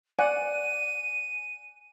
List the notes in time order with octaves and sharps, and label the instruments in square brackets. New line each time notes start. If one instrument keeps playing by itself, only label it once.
[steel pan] D5 F#5 [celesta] G#5 [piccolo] D#7